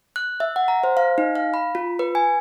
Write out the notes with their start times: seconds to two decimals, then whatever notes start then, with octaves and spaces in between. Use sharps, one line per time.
0.16 F#6
0.40 E5
0.56 F#5
0.68 A#5
0.84 C5
0.97 F5
1.18 D#4
1.35 F5
1.54 B5
1.75 F4
1.99 B4
2.15 G#5